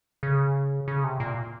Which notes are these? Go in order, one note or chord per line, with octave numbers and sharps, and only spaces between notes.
C#3
C#3
C3
A#2